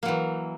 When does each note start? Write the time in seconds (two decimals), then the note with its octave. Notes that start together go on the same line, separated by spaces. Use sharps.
0.03 A#3
0.05 F#3
0.08 E3